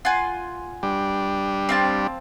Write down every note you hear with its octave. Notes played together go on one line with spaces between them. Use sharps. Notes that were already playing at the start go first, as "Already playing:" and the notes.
F4 F#5 G#5
G3 D4
C4 F5 A5